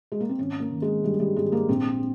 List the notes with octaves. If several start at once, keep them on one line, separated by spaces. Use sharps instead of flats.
G#3
A#3
C4
G#1 C#4
A#3
D#3
G#3
G2 G3
G3
G#1 G#3
A#3
A#1 C4